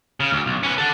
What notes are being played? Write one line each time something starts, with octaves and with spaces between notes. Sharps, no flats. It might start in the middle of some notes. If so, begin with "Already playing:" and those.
C#3
D2
B1
C#4 B4
A4 F#5